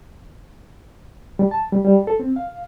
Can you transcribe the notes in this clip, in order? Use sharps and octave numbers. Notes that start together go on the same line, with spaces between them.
G3
A5
G3
G3
A4
C4
F5